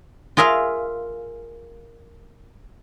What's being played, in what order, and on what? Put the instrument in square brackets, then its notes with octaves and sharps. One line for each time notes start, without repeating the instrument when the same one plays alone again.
[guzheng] F4 G#4 A#4 E5 F5